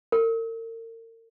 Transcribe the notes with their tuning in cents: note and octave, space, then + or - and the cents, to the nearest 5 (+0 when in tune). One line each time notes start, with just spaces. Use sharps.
A#4 -40